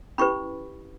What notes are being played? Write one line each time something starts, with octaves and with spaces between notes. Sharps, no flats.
C#4 E4 G4 B4 B5 C#6